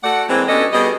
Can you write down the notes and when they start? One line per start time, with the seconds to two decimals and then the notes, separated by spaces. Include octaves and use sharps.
0.04 A3 F#4 A4 D5 F#5
0.29 E3 G#3 A#3 C4
0.49 B2 C#4 D4 G4 A4 D#5
0.73 B2 G3 G#4 D#5